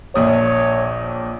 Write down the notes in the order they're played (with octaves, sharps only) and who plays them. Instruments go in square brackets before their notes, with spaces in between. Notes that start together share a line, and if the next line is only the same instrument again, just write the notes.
[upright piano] A#1 A#2 D#6 [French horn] C#5